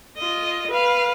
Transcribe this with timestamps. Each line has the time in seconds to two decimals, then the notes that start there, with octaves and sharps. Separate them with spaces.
0.18 F4 D#5
0.71 B4 F5